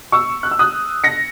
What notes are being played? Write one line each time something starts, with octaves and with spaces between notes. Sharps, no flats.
C#6 E6
F#6
E6
D#6 F#6
A#6 C#7